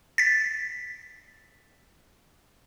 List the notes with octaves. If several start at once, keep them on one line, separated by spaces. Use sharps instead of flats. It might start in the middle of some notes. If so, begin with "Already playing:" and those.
A6 B6